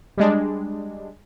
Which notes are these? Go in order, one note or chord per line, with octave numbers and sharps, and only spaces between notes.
G3 G#3 D4